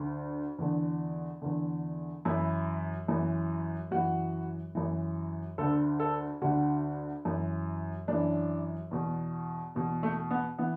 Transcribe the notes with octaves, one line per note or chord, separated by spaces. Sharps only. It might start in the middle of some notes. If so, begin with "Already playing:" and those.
Already playing: D2 D3
E2 D3
E2 D3
F#2 E3 E4
F#2 E3
F#2 E3 F#4
F#2 E3
D2 D3 A4
A4
D2 D3 F#4
F#2 E3
F#2 E3 D4
E2 B2
E2 B2
A3
B3
E3 B3